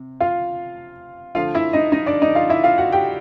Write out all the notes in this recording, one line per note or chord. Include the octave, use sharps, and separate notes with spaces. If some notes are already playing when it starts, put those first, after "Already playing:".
Already playing: C3
F4 F5
D3 F3 A3 F4 F5
E4 E5
D#4 D#5
D#4 D#5
D4 D5
D#4 D#5
F4 F5
E4 E5
F4 F5
F#4 F#5
G4 G5